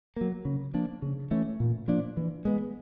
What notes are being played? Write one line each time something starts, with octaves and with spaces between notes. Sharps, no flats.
F#3 A#3
C#3
F3 A#3 D4
C#3
E3 A3 C#4
A#2
F3 A#3 D4
E3
G#3 B3